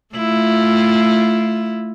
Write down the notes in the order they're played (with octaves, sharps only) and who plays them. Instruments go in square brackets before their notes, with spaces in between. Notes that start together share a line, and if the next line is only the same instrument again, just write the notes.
[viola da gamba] A3 E4 F4